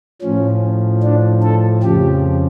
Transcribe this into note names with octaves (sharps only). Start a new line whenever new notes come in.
A2 F3 C#4
D4
A4
F2 C#3 F3 G4